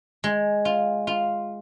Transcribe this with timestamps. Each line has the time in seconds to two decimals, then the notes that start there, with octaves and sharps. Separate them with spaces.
0.24 G#3
0.65 F4
1.07 F4